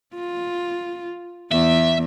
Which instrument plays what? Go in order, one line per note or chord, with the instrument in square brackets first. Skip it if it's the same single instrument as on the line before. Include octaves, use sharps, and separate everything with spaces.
[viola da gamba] F4
[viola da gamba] E2 [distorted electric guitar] E5